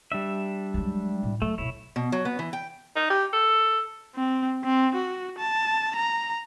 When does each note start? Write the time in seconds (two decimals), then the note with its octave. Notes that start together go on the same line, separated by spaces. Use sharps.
0.12 G3 D4 E5
0.74 F#3 G#3
1.23 A2
1.42 F#3 A3
1.58 D1 B1 E4 C#5
1.96 B2
2.12 F#3
2.25 B3
2.39 E3
2.53 G5
2.96 D#4
3.10 G4
3.33 A4
4.15 C4
4.64 C4
4.95 F#4
5.38 A5
5.96 A#5